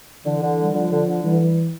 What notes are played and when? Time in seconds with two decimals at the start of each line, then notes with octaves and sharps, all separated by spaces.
0.25 D3 E3
0.42 D3
0.58 G3
0.74 D3 F3
0.92 D3
1.07 D3
1.24 E3 G3
1.41 G3